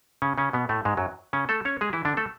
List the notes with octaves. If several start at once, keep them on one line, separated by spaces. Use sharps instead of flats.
C#3 C#4
C#3 C#4
B2 B3
A2 A3
G#2 G#3
F#2 F#3
C#3 C#4
A3 A4
C#4 C#5
G#3 G#4
E3 E4
D3 D4
A3 A4